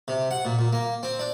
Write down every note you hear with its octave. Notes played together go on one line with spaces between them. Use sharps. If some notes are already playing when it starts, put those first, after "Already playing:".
C3
F#5
A#2
A#2
A#3
C4
D4